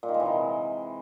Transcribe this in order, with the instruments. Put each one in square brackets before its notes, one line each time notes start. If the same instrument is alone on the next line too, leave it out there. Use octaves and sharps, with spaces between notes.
[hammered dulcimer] A#2
D#3
G#3
E3
C3